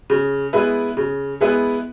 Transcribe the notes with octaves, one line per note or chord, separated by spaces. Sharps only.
C#3
G#3 B3 E4 B4
C#3
G#3 B3 E4 B4